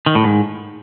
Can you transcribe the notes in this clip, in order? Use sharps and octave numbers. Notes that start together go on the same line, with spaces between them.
D#3
A2
G#2